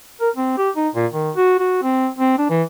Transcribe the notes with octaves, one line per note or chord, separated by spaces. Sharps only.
A#4
C4
G4
D#4
A#2
D#3
F#4
F#4
C4
C4
D4
E3